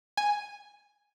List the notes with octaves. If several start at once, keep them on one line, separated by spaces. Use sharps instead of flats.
G#5